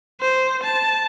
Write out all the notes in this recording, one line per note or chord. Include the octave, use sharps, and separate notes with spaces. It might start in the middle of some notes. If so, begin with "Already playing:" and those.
C5
A5